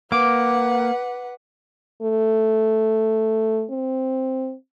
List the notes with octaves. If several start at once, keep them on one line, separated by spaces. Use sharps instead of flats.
A#3 B4 F#5 D6
A3
C4